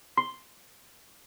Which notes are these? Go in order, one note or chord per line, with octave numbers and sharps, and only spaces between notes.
C6